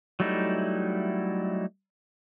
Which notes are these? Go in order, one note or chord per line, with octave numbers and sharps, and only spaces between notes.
F#3 G3 A3 D#4 E4